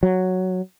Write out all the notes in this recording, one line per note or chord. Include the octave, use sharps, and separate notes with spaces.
F#3